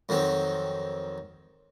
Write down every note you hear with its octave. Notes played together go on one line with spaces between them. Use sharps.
F2 D#3 F#3 C4